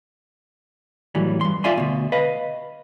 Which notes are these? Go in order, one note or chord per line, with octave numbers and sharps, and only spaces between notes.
A2 E3 F#3 G3
G2 C6
F4 D5 E5 F5 G#5 C6
D2 B2
B4 D#5 F5